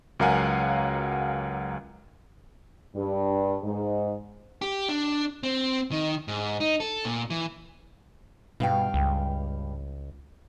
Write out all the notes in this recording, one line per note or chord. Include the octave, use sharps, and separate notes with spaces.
C#2 F#3 A#4 F5 F#5 G#5
G2
G#2
G4
D4
C4
D#3
G#2
D#4
A4
A#2
E3
G2 B2 F5 G5
C#2